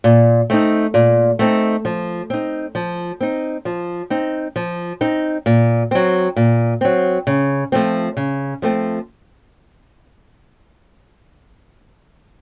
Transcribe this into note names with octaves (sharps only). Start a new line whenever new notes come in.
A#2
A3 C4 D#4
A#2
A3 C4 D#4
F3
C4 D#4
F3
C4 D#4
F3
C4 D#4
F3
C4 D#4
A#2
F#3 C4
A#2
F#3 C4
C#3
F3 A3 C4
C#3
F3 A3 C4